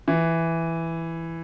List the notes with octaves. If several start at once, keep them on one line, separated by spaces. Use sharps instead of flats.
E3